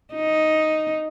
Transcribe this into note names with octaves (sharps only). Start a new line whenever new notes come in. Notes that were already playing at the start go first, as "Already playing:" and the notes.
D#4